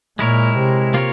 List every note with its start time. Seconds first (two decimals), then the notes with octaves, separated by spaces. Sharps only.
0.19 A#2 G#3 E4 A#4 C#5
0.56 C3
0.94 A#3 F4 A#4 C#5